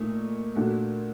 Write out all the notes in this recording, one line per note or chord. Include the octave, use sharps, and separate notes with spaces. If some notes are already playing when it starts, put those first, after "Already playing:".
Already playing: A#2 A3 D#4
A#2 A3 D4 F#4